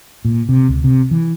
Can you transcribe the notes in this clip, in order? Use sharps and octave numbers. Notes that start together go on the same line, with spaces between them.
A#2
C3
C#2
C3
E3